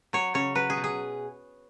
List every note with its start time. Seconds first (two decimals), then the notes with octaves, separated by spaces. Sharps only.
0.13 F#3 C#5
0.34 C#3 C#5
0.55 F#3 B4
0.70 G#4
0.77 B2
0.84 G#4